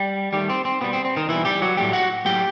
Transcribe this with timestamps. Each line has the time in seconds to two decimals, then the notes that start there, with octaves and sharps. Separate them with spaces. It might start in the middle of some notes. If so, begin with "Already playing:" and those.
Already playing: G3 G4
0.33 D#3 G3 A3 G4
0.50 C4
0.65 C4
0.81 B2 G3 B3
0.93 C4
1.05 C4
1.17 D#3 D#4
1.29 B2 E3 G3 E4
1.45 G3 G4
1.62 F#3 F#4
1.77 A2 F#3 G3 A3 G4
1.93 F#4 F#5
2.25 A2 F#3 A3 G4 G5